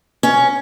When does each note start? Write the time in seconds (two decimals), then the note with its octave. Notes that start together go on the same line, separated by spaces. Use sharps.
0.23 C#4